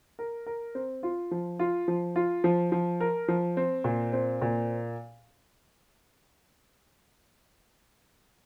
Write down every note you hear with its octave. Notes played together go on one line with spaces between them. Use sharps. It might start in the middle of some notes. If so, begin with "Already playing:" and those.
A#4
A#4
C4
F4
F3
F4
F3
F4
F3
F3
A#4
F3
C4
A#2
C4
A#2